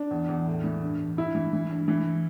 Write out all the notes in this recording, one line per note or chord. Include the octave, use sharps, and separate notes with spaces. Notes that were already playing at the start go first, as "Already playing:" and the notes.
Already playing: D4
E2
E2
A2
E3
G2
G2
G2 E4
E3
E3
G2
E3